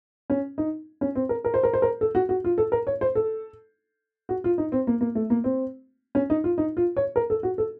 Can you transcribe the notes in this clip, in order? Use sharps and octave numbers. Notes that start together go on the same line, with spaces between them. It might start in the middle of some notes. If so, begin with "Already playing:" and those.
C#4
D#4
C#4
C4
A#4
A#4
C5
A#4
C5
A#4
A4
F#4
F#4
F4
A4
A#4
C#5
C5
A4
F#4
F4
D#4
C4
A#3
A#3
A3
A#3
C4
C#4
D#4
F4
D#4
F4
C#5
A#4
A4
F#4
A4